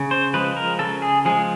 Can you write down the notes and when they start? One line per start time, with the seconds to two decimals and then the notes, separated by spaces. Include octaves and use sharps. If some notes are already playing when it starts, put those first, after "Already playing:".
Already playing: C#3
0.11 C5
0.34 F3 G#3 B4
0.57 A#4
0.79 C#3 A4
1.02 G#4
1.25 F3 G#3 G#4